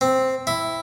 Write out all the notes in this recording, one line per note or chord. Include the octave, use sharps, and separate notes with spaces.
C4
E4